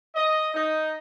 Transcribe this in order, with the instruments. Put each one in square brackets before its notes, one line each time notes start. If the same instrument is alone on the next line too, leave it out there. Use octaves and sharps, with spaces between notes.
[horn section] D#5
D#4